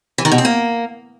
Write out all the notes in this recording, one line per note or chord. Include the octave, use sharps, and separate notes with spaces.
E3
D#3
B2
C4
A#3